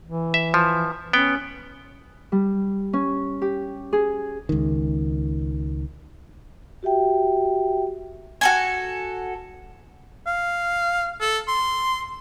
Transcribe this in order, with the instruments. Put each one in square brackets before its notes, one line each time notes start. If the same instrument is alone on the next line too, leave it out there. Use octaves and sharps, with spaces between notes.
[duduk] E3
[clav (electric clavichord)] E5
F3
[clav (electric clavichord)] B3 G5 [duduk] C#4
[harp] G3
C#4
G4
G#4
[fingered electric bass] C#2 D#3
[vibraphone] F#4 G4 E5 G5
[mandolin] F#4 A4 G#5
[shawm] F5
A4
C6